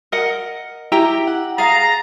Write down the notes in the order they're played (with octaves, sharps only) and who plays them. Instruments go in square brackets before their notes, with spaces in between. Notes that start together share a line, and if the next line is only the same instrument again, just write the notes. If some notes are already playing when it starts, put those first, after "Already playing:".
[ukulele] A#4 D#5 F#5
[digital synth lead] E4 [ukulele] G4 G5 A#5
[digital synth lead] F#5
[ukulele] G#4 F5 [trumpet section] A#5 [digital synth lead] A6